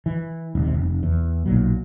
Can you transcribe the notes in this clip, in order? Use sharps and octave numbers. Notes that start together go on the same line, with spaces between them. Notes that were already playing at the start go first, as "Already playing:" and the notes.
E3
D#1 C3
F1
E2
B1 A#2 F#3